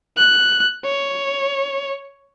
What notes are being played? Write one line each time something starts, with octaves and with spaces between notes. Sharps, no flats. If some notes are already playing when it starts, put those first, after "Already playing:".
F#6
C#5